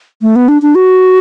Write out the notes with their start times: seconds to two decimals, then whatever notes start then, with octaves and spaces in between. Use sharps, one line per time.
0.22 A3
0.36 B3
0.48 D4
0.62 D4
0.75 F#4